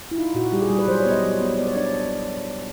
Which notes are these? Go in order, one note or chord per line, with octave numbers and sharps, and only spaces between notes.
E4
D#4 F4
A#2 F#4
G3 G4
G#4
G3
B4
F#3 C5
C#5
B3
D#5
F#3
B3
B3 D5
C#5
D4 D5